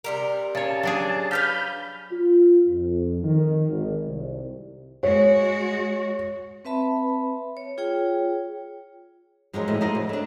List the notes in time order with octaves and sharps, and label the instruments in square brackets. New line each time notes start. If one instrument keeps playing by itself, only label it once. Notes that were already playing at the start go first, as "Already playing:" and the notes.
[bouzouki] C3 G3 A#4
[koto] C#3 C#5 [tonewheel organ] A5
[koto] F#3 D4 G#4
[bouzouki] B4 C#5 F5 [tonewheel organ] B5 F6 G6
[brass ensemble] F4
F2
D#3
G#1
C2
[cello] G#3 F#4 [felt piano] C#5
[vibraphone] C4 B4 E5 A5 B5
C#5
F4 G#4 C#5 G5
[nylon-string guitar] G2 F3 F#3 G#3 F#4 A#4
A2 D#3 E3 A3
F3 A3 F4 F#4 A#4 D#5
C#3
A3 D4